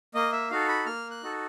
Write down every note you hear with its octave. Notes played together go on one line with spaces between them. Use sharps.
A#3 D#5
E5
D#4 F#4 A4 F5
B5
A#3 F6
F#6
D#4 F#4 A4